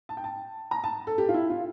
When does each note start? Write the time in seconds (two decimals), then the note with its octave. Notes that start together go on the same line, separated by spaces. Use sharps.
0.09 A5
0.17 G5
0.24 A5
0.71 A#5
0.84 A5
1.07 A4
1.18 G4
1.29 F4
1.34 E4
1.50 F4